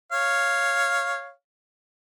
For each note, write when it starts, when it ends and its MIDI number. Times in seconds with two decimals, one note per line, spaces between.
0.12 1.31 73
0.12 1.31 77